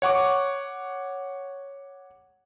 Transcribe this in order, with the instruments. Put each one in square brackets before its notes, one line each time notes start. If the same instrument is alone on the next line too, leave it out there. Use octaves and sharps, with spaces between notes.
[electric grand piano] C#5 F#5 C#6 D6